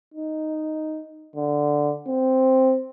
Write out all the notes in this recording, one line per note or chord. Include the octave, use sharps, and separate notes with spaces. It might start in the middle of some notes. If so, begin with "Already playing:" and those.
D#4
D3
C4